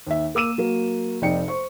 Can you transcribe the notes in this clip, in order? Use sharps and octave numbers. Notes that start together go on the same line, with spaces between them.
D#2 E5
A#3 D6 E6 D#7 E7
F#3 A#3
F1 C3 D#4 D5 G5 C#7
C5 C#6